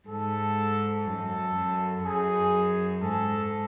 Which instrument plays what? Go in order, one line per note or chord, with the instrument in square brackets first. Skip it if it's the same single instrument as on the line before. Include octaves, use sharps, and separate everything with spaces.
[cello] G#2 [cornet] A4
[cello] F#2 [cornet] A4
[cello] F#2
[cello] F#2 [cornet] G#4
[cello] G#2 [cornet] A4